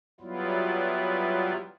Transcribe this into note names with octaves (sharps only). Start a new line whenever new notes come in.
F#3 G3 B3 E4 F4